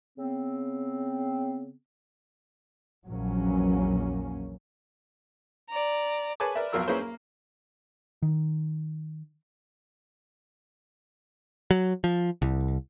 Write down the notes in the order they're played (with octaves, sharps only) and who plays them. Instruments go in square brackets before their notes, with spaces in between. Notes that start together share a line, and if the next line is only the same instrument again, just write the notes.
[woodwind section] C#3 B3 C4
[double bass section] A#1 E2 F#3 A#3 C#4
[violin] D5 A#5
[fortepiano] G#4 B4 C#5 G#5 A5 D6
A#4 B4 D5 E5
B1 F2 F#3 F4 A#4 E6
A#3 C#4 E4 G#4 B4 C5
A#3
[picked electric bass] D#3
F#3
F3
C2